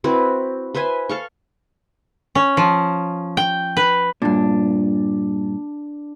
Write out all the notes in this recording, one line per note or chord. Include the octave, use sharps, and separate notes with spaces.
C4 E4 F#4 B4
B4 C5 E5 G#5
A4 F5 C#6
C#4
F3
G5
B4
G2 A#2 D4